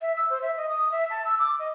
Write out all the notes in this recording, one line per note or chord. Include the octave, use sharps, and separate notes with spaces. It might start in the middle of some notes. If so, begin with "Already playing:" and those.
E5
E6
C5
E5
D#5
D#6
E5
A5
E6
D6
D#5